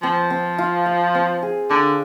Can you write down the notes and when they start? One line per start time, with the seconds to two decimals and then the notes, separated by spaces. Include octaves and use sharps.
0.02 F3 C4
0.30 C4
0.58 F4
0.86 F5
1.15 C4
1.43 G#4
1.70 D3 D4